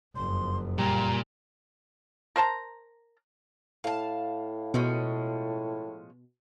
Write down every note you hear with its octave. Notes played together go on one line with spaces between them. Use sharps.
F#1 F2 C6
A#2 G3 A#5
A#4 C5 A5 A#5
A2 F5 A5
B2 F3 G#3 C#4